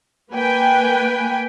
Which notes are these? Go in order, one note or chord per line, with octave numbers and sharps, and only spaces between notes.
A#3 B4 G5 G#5